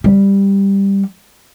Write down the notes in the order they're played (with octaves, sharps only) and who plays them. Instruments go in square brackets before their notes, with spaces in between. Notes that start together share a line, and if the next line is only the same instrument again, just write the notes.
[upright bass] G3